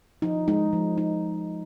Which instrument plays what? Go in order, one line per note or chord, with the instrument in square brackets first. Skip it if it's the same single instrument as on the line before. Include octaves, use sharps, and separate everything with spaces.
[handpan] F3 D#4
G#3 D#4
F3
D#4